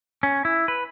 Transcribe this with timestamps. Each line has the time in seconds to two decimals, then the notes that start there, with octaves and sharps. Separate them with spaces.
0.23 C#4
0.45 E4
0.68 B4